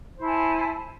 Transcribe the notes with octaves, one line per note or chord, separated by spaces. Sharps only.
E4 C5 G#5 A5